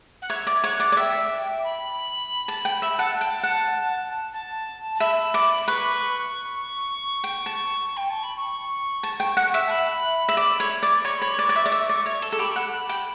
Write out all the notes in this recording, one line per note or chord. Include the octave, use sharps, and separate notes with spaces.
F#5
C#5 E5
D5
C#5 F#5
D5
D5
E5 G5
B5
A5
G5
E5
F#5 A5
G5
F#5
A5
A5
E5 B5
D5
B4 C#6
G5
A5
G5
A5
B5
C#6
A5
G5
F#5
E5
A5
B5
E5
D5
C#5
D5
C#5 C#6
C#5 B5
C#6
D5
D5
E5
D5
E5
D5
C#5
A4
A4
G4 B5
F#5
G5